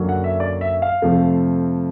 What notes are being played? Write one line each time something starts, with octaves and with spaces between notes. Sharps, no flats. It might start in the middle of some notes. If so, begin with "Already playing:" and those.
Already playing: F#2 D3 F#3 A#3
F#5
E5
D5
E5
F5
F2 C3 F3 A3